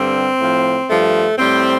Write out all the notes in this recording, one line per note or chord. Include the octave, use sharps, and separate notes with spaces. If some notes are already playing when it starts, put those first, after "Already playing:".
Already playing: G2 D3 G3 C4
A2 F3
G2 F3 A3
A2 G3 C4